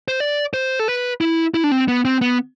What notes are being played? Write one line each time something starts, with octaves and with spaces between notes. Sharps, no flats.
C5
D5
C5
A4
B4
E4
E4
D4
C4
B3
C4
B3